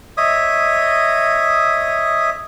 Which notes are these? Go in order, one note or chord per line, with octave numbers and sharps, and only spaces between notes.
C#5 D#5 E5 D#6